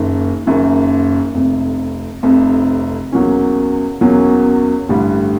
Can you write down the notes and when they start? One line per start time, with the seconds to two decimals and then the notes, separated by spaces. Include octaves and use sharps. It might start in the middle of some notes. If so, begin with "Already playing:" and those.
Already playing: F#1 F#2 D#3
0.46 F#1 F#2 D#3
1.34 F1 F2 C3
2.23 F1 F2 C3
3.12 E2 B2 F#3 A#3 C#4
4.01 E2 B2 F#3 A#3 C#4
4.89 A1 G2 D3 G3